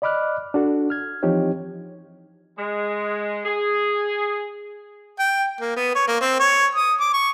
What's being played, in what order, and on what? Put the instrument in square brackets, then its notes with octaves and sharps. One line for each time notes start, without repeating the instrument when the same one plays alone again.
[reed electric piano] D5 D#5 B5 D6 F6 F#6
D4 F#4 A4
F6 G#6
E3 F3 C4 D#4 G4 C#5
[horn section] G#3
G#4
[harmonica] G5
A#3
B3
C#5
A#3
C4
C#5
D#6
D6
C#6